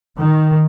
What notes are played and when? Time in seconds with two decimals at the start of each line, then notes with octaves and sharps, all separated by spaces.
0.18 D#3